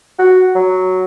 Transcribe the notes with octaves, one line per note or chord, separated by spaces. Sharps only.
F#4
F#3